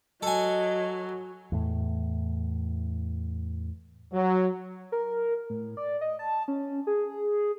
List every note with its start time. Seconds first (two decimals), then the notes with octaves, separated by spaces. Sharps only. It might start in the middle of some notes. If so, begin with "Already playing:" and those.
0.23 F#3 A4 D#5 G#5
1.52 E2 A2
4.13 F#3
4.92 A#4
5.50 A2
5.77 D5
6.01 D#5
6.19 A5
6.48 C#4
6.87 G#4